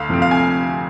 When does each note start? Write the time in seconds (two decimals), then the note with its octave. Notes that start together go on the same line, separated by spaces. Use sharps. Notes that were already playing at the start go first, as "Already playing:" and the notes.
Already playing: D2 F5
0.09 C3 F3 A3 C4
0.22 F5
0.31 G#5